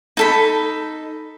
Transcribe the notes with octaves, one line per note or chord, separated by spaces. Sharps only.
D#4 A4 B5